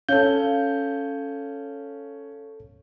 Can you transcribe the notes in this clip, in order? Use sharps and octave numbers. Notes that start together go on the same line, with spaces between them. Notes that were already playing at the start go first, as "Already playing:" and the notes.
C#4 A4 F5 G6